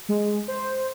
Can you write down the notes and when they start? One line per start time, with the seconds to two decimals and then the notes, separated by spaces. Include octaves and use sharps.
0.09 G#3
0.48 C5